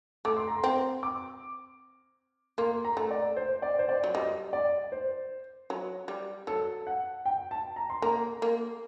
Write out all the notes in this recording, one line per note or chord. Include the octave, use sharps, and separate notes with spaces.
A3 D6
C6
A#5
C6
C4
D6
A#3 C6
A#5
A3
D5
C5
D5
C5
D5
F#3
G3 D#5
D5
C5
F#3
G3
F#3 A4
F#5
G5
A5
A#5
C6
A#3 A#5
A#3